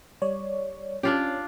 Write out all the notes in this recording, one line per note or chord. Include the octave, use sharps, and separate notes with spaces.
G3 C#5 D5
C#4 D4 F4 G4